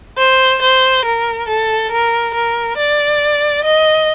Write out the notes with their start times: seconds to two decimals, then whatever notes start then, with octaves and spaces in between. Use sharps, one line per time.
0.18 C5
0.62 C5
1.05 A#4
1.48 A4
1.91 A#4
2.34 A#4
2.77 D5
3.64 D#5